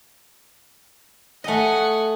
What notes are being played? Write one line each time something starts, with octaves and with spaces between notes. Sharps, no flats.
A3 D#5 F#5 G#5